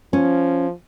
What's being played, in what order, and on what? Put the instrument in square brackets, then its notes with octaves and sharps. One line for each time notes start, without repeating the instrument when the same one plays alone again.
[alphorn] F3 [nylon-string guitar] C#4